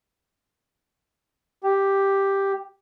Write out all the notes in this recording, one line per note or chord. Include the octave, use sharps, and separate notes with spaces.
G4